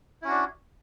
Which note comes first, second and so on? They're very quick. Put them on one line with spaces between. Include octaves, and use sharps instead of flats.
E4 C#4 F#4 D4